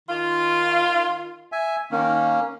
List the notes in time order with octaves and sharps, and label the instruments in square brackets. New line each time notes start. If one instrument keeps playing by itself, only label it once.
[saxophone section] D#3 F4
[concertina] E5 G#5
[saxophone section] D#3 [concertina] A#3 C#4